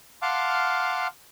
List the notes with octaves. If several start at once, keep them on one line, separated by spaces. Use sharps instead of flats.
F5 F#5 A5 C6 D6 F6